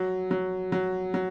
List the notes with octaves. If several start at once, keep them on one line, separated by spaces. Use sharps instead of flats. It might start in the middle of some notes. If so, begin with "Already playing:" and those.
Already playing: F#3
F#3
F#3
F#3